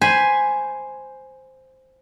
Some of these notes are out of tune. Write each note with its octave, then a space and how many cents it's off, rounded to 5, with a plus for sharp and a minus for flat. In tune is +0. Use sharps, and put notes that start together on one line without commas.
C5 +0 G#5 +0 B5 +0